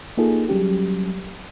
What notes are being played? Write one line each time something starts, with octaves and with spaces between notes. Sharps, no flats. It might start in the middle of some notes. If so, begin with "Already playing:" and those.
A#3 D#4 F4 G#4 A4
F#3 G3 C#4 G4